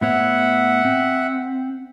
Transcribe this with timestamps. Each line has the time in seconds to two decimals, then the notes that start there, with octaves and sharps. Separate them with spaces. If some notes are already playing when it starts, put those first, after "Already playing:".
0.01 A2 B3 C#5 E5 F#5
0.85 C4